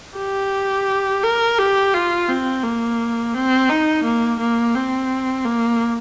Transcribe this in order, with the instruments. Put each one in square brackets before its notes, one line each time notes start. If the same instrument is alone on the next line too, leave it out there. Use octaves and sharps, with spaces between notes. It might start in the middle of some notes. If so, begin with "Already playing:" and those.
[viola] G4
A#4
G4
F4
C4
A#3
C4
D#4
A#3
A#3
C4
A#3